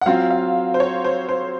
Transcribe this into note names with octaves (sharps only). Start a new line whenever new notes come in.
F#5
F#3 C4 F4 F5
F5
C5
C#5
C5
C5